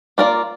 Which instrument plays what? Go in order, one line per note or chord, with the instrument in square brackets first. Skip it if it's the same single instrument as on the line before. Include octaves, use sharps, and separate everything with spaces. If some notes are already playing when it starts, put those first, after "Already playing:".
[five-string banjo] A#3 F4 A#4 D5